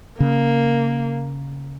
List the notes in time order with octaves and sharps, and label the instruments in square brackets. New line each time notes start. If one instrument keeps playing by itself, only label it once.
[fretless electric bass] C#3 [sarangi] A#3